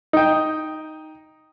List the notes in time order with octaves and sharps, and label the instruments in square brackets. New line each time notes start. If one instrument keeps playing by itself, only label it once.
[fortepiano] D#4 G5